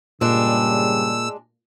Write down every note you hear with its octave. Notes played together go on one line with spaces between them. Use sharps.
G2 A#2 C#3 G3 G#3 D4 E6